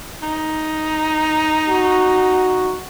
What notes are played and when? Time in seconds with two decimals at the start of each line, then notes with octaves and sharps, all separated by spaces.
0.22 D#4
1.69 F#4